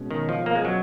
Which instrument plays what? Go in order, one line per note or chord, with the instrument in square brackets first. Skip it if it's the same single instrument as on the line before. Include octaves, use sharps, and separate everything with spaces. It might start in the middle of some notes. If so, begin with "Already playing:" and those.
Already playing: [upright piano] B2 G#3 C#4
[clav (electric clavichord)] D#3
F3
A#3
G#3
F#3